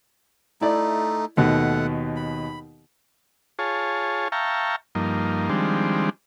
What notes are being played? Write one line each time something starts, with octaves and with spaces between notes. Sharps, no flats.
A3 D#4 E4 D5
D#2 B2 A3 F#5
B5
F4 G#4 C#5 A5
E5 F5 G5 A5 A#5 C#6
G2 F3 A#3 D#4
D#3 F3 G3 G#3 C4 D4